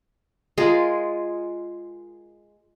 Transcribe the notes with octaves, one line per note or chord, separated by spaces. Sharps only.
G#3 F4 G#4 A#4